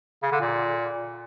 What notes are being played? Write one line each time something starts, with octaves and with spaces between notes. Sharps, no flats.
C#3
D3
A#2